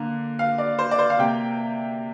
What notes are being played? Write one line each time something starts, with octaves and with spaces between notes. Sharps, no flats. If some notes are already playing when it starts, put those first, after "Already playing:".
Already playing: D3 A#3
F5
D5
C5
D5
C5
F5
C3 A#3 G5